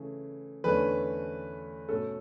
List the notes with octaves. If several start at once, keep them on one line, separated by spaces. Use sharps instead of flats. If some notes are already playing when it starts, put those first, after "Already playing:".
Already playing: C#3 E3 A3
E2 D3 A3 C#4 B4
B2 A3 C#4 A4